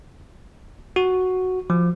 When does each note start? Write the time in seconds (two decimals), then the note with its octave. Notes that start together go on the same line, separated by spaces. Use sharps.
0.96 F#4
1.70 F3